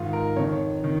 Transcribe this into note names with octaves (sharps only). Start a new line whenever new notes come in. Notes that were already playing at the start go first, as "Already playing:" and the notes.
Already playing: G#2 D#3 F4
A#4
F2 D#3 C#5
D#3